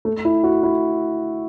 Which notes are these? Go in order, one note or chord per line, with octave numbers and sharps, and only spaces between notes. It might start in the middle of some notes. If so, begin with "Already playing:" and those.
A3
E4
F#4
E4